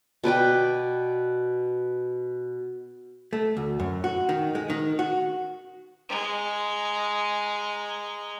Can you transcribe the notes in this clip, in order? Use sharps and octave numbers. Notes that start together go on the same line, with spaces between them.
B2 B4 D5 G5
A3
D2
F#2
F#4
D#3
G#3
D#3
F#4
G#3 A#5